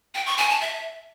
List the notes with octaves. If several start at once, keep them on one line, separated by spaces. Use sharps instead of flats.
G5
C#6
G#5
A5
E5